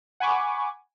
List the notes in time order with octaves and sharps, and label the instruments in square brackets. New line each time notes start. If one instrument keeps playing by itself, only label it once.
[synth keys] F#5 G#5 B5 C#6 D6